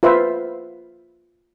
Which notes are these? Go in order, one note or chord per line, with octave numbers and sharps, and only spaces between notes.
F4 B4 C5 E5